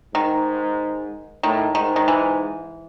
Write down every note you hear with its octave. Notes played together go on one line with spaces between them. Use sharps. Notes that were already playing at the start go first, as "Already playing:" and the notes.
G#2 D#3
A2 D#3
G#2 D#3
D#3
E3